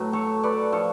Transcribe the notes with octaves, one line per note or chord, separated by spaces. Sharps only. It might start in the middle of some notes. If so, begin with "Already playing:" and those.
Already playing: A2 F#3 F#4 B4
A4 C#5
B4 D5
F3 A4 C#5